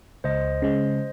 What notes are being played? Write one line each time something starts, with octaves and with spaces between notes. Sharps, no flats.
C#2 C5 D#5
C#3 G#3